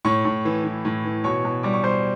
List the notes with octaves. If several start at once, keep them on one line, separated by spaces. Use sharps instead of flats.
A2 C#5 C#6
A2
E3
E3
A2
E3
B2 C#5 C#6
B2
G3 D6
C#6
G3 C5 C6